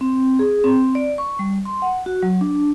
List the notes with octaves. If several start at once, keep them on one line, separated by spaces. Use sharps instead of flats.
C4
G#4
C4
D5
C#6
G3
C6
F#5
F#4
F#3
D4